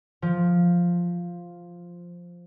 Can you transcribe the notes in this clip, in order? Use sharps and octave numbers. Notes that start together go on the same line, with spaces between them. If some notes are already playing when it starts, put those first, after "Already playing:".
F3